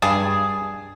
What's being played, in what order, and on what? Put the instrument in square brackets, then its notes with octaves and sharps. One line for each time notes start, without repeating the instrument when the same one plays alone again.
[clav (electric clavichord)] G2 A5 [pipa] G#4